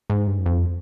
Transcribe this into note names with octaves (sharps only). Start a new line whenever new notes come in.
G#2
G2
F#2
F2